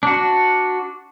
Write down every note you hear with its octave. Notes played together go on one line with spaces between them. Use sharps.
D4 F#4